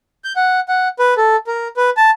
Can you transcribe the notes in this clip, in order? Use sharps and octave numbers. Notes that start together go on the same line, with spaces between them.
G6
F#5
F#5
B4
A4
A#4
B4
A5